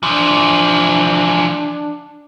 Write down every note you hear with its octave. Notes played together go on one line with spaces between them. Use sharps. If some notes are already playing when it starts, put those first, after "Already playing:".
E3 F3 D4